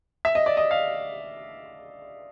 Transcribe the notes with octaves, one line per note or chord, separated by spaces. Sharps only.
E5
D#5
D5
D#5
F5